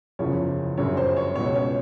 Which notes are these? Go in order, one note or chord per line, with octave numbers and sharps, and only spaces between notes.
F#1 E2 C#3 F3 C#5
G1 F#2 C#3 C#5
C5
C#5
C#2 B2 C#5
C#5